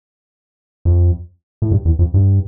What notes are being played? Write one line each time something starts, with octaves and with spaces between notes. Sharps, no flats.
F2
A2
G2
E2
F2
G2